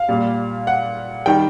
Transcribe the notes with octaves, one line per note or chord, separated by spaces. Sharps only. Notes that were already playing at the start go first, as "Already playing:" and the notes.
Already playing: F5
A#2 G3
F#5
D#3 G3 G5